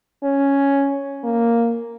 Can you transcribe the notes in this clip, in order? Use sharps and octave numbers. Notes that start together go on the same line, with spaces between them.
C#4
A#3